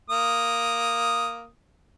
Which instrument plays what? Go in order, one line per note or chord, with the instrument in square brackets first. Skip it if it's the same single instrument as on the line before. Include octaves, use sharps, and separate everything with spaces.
[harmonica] A#3 D#6